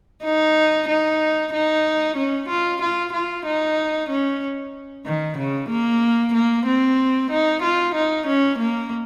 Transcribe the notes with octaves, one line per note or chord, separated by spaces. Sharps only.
D#4
D#4
D#4
C#4
F4
F4
F4
D#4
C#4
D#3
C#3
A#3
A#3
C4
D#4
F4
D#4
C#4
A#3